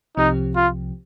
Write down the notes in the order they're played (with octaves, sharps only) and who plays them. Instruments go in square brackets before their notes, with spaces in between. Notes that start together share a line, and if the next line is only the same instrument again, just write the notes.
[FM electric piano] C2 C3 F3 C4 G4 [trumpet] D#4
[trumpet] F4